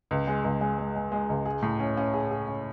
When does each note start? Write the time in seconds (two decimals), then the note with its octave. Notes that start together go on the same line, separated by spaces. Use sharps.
0.11 C#2
0.27 G#3
0.44 C#2
0.61 G#3
0.78 G#3
0.96 G#3
1.12 G#3
1.29 C#2
1.46 G#4
1.62 A2
1.80 C#4
1.97 C#4
2.13 G#4
2.31 G#4
2.47 C#4